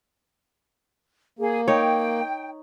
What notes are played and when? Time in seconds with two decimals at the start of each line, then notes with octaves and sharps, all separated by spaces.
1.39 A#3 G#4
1.68 D#4 C#5 G5